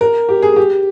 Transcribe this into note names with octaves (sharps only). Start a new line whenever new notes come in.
A#4
G4
G#4
G4